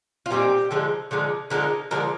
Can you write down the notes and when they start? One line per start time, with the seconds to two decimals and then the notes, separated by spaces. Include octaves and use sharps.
0.26 F4
0.31 A#2 G3 C4 D#4 G4
0.71 D3 F3 G#3 D#4
1.11 D3 F3 G#3 D#4
1.50 D3 F3 G#3 D#4 A#4
1.91 D3 F3 G#3 D#4 A#4